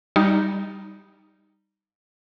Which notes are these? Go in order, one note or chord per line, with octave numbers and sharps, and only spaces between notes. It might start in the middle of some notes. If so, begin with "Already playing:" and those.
G3 D#4